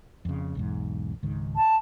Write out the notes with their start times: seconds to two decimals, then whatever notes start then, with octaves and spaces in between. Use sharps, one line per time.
0.25 F2 C#3
0.55 B1 E2 G#2
1.23 C#2 G#2 D#3
1.56 A5